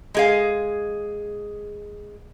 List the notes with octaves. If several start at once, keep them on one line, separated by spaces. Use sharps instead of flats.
G#3 G#4 F5